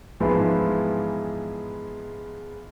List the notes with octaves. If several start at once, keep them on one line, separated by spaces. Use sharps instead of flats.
G#2 E3 F3 G#3 B3 E4